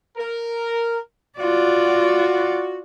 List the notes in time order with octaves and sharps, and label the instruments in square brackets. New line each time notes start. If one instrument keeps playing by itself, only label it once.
[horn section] A#4
[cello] F4 D5 [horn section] F#4